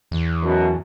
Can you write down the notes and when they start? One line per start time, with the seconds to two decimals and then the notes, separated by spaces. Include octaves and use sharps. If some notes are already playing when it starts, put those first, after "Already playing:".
0.11 E2
0.42 F#2 B2